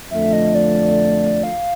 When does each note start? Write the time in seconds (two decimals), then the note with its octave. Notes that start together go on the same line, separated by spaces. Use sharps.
0.11 F2 D3 F3 A3 E5
0.33 D#5
0.55 D5
1.43 F5